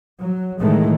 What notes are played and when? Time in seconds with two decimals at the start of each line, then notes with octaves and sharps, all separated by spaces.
0.21 F#3
0.60 A2 D#3 E3 G#3 A3